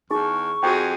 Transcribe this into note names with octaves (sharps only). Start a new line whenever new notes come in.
E2 D#4 G#4 C#6
F2 F#4 G#4 G5